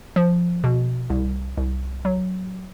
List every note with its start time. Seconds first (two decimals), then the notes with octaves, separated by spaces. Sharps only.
0.16 F3
0.64 B2
1.10 C2
1.58 C2
2.05 F#3